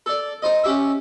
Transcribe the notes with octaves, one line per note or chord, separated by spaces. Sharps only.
A4 D5
D#4 C5 D#5
C#4 G4 E5